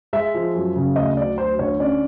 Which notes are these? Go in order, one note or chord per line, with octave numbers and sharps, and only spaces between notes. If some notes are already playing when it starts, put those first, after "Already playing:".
G#3 E5
F3
F#2
C#3
D2 D#5
F#3 D5
D2 C5
D3 C#5
C#4 D5